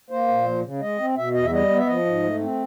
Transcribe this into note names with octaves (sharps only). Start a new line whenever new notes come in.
A#3 C5
A#2
F3
C#3
G#3 D#5
C4
B2 E5
E2 D#5
E5
G3 D#5
B3
E5
F3 D#5
G#2
A3
C4